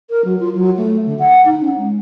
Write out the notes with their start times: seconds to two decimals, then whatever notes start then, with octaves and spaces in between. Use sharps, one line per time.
0.10 A#4
0.25 F#3
0.40 F4
0.55 F#3
0.77 A3
1.06 D3
1.19 F#5
1.46 D#4
1.61 C#4
1.78 G#3